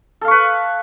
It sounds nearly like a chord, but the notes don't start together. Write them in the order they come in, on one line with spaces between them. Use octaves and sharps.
A4 F5 C#6 B4